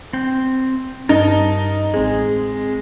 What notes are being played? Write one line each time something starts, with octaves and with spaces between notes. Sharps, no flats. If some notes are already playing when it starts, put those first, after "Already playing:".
C4 G5
G2 D#4 A#4 A5
A1 G#3 C4 G#4